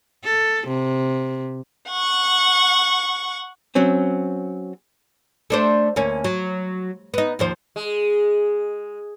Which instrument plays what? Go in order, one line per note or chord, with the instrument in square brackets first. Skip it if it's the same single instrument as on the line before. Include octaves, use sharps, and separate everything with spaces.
[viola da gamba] A4
C3
[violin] F#5 C#6
[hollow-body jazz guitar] F#3 C4 C#4
[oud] A3 D4 C5
D2 A#3 C#4
F#3
B3 D#4
D#2 F3 C5
[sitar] G#3